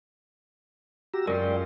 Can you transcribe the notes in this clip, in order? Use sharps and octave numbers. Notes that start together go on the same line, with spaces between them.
F#4 G4 A#5 E6
F#2 G#3 C#4 F4 A#4 D5 G5